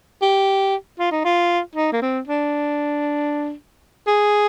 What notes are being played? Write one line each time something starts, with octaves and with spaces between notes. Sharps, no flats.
G4
F4
D#4
F4
D#4
A#3
C4
D4
G#4